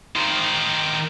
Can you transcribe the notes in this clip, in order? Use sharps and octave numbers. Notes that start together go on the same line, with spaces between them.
D#3 C5